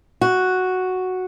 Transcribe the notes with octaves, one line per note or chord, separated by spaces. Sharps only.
F#4